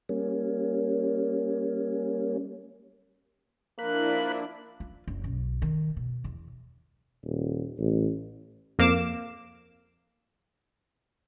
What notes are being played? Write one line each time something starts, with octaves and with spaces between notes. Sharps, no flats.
G3 A#3 C#4
F3 A#3 D4 E4 A#4 B5 F#6
F4
F#1
B1
D#3
B2
E2
D#1
A1
F2 A#3 F5 D6 E7